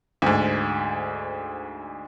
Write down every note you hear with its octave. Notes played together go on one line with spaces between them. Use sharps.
D2 G#2